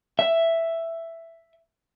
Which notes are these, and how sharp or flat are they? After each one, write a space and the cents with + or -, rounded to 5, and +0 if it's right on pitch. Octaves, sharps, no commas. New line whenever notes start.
E5 +5